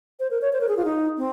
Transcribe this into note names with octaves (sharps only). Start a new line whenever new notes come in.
C5
A#4
C#5
C5
A#4
G#4
F4
D#4
C4